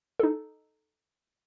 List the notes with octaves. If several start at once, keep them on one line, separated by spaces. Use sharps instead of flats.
D#4 A4